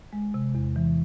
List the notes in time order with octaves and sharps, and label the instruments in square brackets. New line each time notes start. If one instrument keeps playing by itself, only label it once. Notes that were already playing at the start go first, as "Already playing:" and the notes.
[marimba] G#3
C3
E2
E3